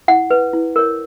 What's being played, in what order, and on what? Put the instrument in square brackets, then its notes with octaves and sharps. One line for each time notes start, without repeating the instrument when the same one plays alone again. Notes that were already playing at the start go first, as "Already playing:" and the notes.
[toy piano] E4 F#5
B4
E4
A#4 C#5